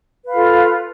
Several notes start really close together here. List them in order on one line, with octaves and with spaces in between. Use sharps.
B4 F5 F4 A4